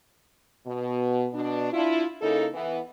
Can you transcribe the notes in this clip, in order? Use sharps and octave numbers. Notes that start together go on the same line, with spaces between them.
B2
B2 D4
D4 E4 F4
C#3 A#3 D#4 E4 A4
E3 B3